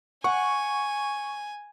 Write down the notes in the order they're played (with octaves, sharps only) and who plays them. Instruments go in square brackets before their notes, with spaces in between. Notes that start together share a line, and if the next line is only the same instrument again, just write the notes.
[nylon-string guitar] F#5 [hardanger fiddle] G#5 [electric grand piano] C#6